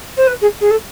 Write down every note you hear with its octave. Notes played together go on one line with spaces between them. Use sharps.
C5
B4
G#4
G#4
A4